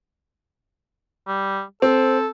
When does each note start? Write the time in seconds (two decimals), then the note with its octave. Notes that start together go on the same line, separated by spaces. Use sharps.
1.27 G3
1.82 C4 A4